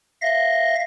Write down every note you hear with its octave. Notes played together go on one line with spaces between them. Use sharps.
E5 F5 A#6